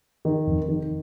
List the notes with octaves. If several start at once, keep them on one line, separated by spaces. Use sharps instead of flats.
D#3
F1
D#3